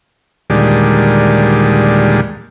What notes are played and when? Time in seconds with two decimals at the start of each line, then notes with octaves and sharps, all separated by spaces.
0.50 D#2 A#2 D3 G3 G#3